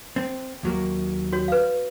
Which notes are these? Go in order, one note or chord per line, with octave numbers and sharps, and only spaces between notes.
C4
D#2 F#3 A#3
F#4 C#5
B4 F5